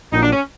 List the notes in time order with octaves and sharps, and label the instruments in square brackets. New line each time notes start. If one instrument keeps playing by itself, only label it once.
[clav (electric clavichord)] A#1 A#2 F#3 [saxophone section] D#4
[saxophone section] D4
C#4